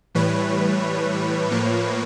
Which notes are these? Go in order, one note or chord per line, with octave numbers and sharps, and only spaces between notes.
A2 E3 G3 B4 C#5
A2 F3 A#3